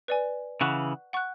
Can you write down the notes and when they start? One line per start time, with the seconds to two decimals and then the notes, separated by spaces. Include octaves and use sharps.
0.08 B4 D5 G#5
0.61 C#3 E3 F#5 C#6 F#6
1.13 F#5 C#6 F#6